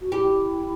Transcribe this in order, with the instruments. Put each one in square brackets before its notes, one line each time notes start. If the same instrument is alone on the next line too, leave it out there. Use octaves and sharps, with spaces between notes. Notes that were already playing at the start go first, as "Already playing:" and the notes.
[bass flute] F#4
[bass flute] E4 [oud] G4